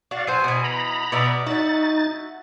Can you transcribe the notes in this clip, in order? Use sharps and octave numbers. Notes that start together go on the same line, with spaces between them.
F#4 D5 F5
F#3 C5 G#5
B2 E3
A#5 B5
B2 D5 E5
D#4 F#4 E5 A6